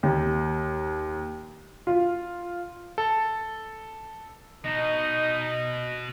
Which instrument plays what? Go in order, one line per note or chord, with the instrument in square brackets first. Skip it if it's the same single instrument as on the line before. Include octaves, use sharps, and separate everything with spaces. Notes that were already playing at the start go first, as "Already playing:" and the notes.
[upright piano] D#2
F4
[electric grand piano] A4
[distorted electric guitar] B2 [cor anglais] D#4 [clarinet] D#5